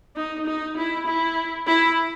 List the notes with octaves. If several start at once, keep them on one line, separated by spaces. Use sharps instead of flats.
D#4
D#4
E4
E4
E4